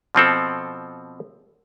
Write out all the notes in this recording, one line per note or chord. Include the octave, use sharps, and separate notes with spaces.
B2 F3 C4 A4